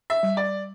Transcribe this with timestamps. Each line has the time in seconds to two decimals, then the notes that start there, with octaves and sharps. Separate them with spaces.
0.10 E5
0.23 G3
0.37 D5